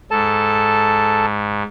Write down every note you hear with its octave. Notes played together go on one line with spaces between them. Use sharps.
G#2 A4 A5